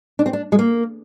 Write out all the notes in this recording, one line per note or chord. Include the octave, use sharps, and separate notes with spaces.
D4
C4
D4
G#3
A#3